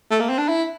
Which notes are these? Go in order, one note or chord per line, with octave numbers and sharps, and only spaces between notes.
A3
A#3
C4
D4
E4